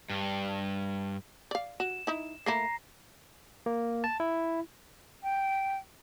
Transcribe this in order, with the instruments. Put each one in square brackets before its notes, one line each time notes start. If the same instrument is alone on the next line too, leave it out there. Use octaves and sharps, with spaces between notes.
[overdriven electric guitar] G2
[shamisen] D5 F5
[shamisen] F#4 [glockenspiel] E7
[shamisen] D#4 E4
[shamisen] A3 A#3 E4 [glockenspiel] A#5 A#6 C7
[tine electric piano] A#3
A5
E4
[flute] G5